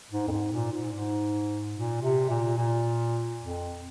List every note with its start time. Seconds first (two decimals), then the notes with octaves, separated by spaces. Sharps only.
0.11 G#2
0.28 F2
0.31 G#2
0.52 A#2
0.72 G#2
0.92 G#2
1.75 A#2
2.02 C3
2.29 A#2
2.57 A#2
3.39 F2